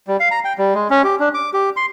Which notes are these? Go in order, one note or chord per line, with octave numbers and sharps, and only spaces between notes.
G3
F5
A#5
G5
G3
G#3
C#4
G4
D4
D6
G4
C6